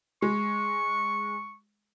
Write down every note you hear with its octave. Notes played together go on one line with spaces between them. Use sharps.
G#3 C#6